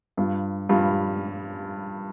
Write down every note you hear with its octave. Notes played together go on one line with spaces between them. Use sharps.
G2 G3 F4
G2 G3 F4